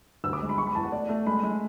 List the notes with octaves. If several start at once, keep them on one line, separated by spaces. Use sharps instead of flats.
D2 E6
D6
G#3
B5
G#3 C#6
B5
E2 A5
F#5
A3 D5
A3
G#3 B5
G#3